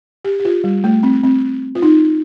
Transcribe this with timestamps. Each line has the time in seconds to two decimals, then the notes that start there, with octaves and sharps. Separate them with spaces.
0.25 G4
0.40 G4
0.45 F4
0.64 G3
0.84 A3
1.03 C4
1.23 C4
1.75 F4
1.82 D#4